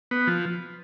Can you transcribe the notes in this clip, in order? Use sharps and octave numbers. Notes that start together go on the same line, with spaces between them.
B3
F3